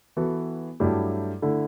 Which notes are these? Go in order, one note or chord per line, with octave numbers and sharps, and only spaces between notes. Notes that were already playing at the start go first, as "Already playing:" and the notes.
E3 B3 F#4 A4
G2 F#3 A3 E4 G4
D3 A3 E4